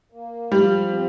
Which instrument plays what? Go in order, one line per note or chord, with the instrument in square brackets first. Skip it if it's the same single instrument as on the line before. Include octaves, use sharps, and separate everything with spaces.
[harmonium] A#3
[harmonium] F3 [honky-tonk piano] G3
[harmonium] C4